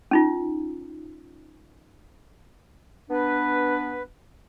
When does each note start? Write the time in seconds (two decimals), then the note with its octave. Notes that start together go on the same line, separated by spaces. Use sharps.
0.11 C#4 D#4 F4
3.11 B3 D4 B4